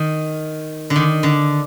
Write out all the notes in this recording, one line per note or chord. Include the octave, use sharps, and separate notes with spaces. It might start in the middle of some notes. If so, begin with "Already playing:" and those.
Already playing: D#3
D3
D#3
D3